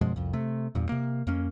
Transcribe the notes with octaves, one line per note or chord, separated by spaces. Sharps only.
F#2 B2 F3 G#3
C2 F2
C3 A3
E2 G2 A#2
C3 A#3
F2 A#3 C#4